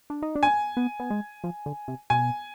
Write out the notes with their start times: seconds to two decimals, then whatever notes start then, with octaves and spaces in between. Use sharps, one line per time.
0.10 D4
0.22 D#4
0.35 D4
0.43 G#5
0.77 B3
1.00 B3
1.10 G#3
1.44 F3
1.66 D3
1.88 C3
2.10 B2 G#5